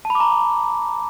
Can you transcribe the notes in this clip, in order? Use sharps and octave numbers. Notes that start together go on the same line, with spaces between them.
A5
B5
D6
A#5